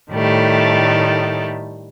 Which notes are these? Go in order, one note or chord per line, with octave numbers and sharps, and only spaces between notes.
A2 D#3 G3 A3